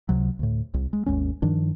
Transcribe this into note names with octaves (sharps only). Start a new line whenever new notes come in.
C#2 C3 F#3
D2 A2
C2
G#3
G#1 D#2 G#3 C#4
G2 D#3 F3 D4